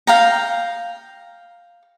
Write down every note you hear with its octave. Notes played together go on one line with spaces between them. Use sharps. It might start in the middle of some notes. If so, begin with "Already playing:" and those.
F5 G5 A#5